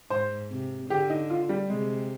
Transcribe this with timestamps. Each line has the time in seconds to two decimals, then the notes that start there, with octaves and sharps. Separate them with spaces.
0.10 G#2 C5
0.51 C3
0.90 D3 G4
1.10 D#4
1.30 F4
1.49 G3
1.69 C3 G#3